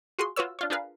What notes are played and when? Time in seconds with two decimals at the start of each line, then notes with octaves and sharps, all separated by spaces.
0.19 F4 F#4 G#4 C6
0.36 F4 F#4 B4 C#5 E6
0.59 D4 F4 C#5
0.70 D4 F4 G#4 A#4 B4 F5